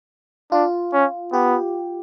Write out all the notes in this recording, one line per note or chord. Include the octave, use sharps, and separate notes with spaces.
D4 F4
C#4
B3 G4